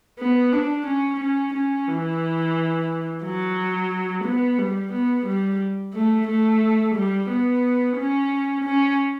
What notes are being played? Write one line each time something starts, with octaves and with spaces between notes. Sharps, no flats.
B3
D4
C#4
C#4
C#4
E3
F#3
B3
G3
B3
G3
A3
A3
G3
B3
C#4
C#4